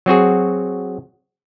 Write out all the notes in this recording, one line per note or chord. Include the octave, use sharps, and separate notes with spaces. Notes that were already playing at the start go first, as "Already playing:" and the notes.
F#3 C4 F#4 G#4